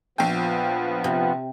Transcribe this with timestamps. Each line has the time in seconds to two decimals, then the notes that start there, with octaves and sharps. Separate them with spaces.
0.18 A#1 F3 B3 G5
1.04 C3